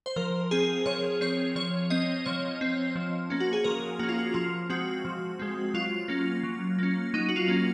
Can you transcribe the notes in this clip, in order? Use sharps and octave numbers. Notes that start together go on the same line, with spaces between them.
C5
F3 A#4
C4 G#4
F3 C#5
C4 C#5
F3 C#5
C4 D#5
F3 C#5
C4
F3
A#3 C#4
F#4
G#4
F3 A#4
A#3 C#4 F#4
F4
F#4
F3 F4
G#3 C4 F#4
F3
G#3 C4
F#3 F4
A#3 C#4
F#3
A#3 C#4
F#3 D#4
F#4
F4
A#3 C#4